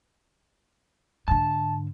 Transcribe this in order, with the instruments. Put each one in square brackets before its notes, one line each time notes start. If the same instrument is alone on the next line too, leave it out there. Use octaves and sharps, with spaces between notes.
[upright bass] G#2 D3 [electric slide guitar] A5